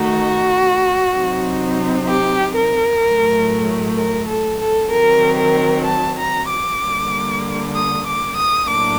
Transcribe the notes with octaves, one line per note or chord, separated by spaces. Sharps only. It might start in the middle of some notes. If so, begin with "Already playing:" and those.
Already playing: D#3 A3 D#4 F#4
C3 F#3 C4 D#4
G4
A#4
A2 F#3 A3
A#4
A4
A4
D#3 F#3 C4 A#4
A#4
A5
A#5
D6
D3 G3 A#3
D#6
D6
D#6
A2 F#3 A#3 D4 D6